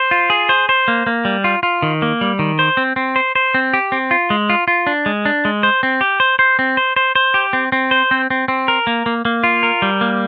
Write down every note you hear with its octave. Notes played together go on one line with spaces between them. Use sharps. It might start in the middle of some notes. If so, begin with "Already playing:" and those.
Already playing: C5
F4
G#4
C5
C5
A#3
A#3
G3
F4
F4
D#3
A#3
G3
D#3
C5
C4
C4
C5
C5
C4
G4
C4
F4
G#3
F4
F4
D4
G#3
D4
G#3
C5
C4
G4
C5
C5
C4
C5
C5
C5
G4
C4
C4
C5
C4
C4
C4
A#4
A#3
A#3
A#3
F4
A#4
G3
A#3